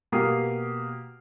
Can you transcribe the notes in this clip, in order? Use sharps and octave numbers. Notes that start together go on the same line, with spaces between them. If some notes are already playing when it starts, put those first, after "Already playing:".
B2 A#3 G4 D#6 F6 C7